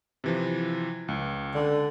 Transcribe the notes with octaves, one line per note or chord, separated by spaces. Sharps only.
C3 E3 F3
C#2
D3